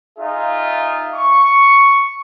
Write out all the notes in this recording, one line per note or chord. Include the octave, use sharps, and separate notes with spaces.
D#4 F4 G#4 E5
C#6